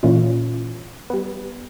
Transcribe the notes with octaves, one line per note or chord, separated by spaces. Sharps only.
A#2 E3 C#4 F4
G3 B3